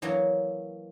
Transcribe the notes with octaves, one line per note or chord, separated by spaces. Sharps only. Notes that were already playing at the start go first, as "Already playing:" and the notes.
E3 F#3 A#3 F#4 C#5 D#5